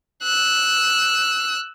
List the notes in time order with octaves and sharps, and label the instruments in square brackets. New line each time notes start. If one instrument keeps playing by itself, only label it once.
[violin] E6 F#6